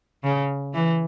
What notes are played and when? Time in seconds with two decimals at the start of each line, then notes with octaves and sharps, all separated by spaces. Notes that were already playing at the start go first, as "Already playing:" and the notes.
0.24 C#3
0.74 E3